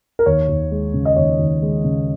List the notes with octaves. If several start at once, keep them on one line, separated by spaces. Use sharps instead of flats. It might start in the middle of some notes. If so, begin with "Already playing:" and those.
A#4
D#2 C#5
D#2
G#3
C#3
D#5
D#2 C#5
D#2
G#3
C#3